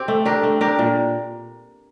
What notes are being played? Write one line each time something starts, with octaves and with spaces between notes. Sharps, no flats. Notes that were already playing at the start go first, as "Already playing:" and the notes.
Already playing: C4 G4
A3
D4 G4 A#4
A3
D4 G4 A#4
A#2